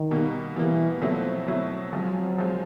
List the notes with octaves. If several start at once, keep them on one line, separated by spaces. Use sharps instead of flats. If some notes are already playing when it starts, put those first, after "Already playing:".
Already playing: D#3
B2 G3 A#3
B2 E3 G3 A#3
B2 F3 F#3 A3 C4 E4
B2 F#3 A3 C4 E4
F3 F#3 G#3 C4
F3 G#3 C4